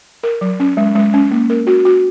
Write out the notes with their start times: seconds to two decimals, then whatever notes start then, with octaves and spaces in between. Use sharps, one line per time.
0.23 A#4
0.41 F#3
0.60 C#4
0.77 G#3
0.95 G#3
1.14 C#4
1.31 A#3
1.50 A#4
1.67 F#4
1.85 F#4